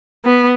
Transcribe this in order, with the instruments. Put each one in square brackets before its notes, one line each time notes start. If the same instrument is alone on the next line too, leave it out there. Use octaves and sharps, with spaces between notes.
[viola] B3